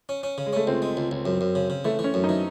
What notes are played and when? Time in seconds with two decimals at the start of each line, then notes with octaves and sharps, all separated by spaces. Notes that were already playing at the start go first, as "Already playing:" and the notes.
0.09 C#4
0.23 C#4
0.38 C#3
0.46 G#3
0.53 A3 C#4
0.67 C#2 C4
0.82 G#3
0.97 C#2
1.11 C#2
1.26 F#2
1.41 F#2
1.55 C#3
1.70 C#3
1.85 E3 A3
1.99 E3
2.04 C#4
2.14 F#2
2.24 D#4
2.29 E3